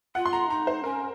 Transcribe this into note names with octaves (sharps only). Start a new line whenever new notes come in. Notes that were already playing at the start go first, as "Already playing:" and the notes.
F4 F#5
C6
A#5
D#4 A#5
C5
C#4 A#4